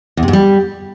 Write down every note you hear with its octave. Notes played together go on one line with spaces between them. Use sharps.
E2
C3
G#2
G3